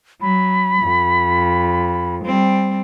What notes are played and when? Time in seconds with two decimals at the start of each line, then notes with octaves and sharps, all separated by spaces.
0.21 F#3 B5
0.82 F2
2.24 G3 C4